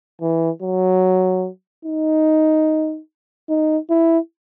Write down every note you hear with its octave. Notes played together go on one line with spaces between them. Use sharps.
E3
F#3
D#4
D#4
E4